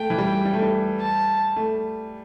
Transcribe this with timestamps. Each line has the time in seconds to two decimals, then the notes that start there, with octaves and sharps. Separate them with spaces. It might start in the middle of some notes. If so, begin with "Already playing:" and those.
Already playing: A3 G5
0.10 E3
0.18 G3
0.45 G3
0.53 A3
0.62 G3
1.00 A5
1.56 A3